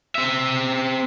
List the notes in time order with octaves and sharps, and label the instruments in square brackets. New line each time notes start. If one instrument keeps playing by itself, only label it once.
[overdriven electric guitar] C4 E5